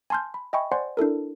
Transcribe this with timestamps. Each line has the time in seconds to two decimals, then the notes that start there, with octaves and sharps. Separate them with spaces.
0.10 G#5 A5 C6 F6 G6
0.34 B5
0.53 D#5 E5 G5 G#5 B5 C#6
0.72 C5 D5 F#5 G#5 C6
0.97 D4 E4 A4 A#4